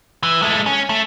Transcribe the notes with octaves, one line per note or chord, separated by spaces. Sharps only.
E3
G#3 A3
C#4
A3